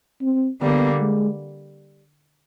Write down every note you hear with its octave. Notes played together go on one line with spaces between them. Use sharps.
C4
D3 G3 A#3 B3
G#3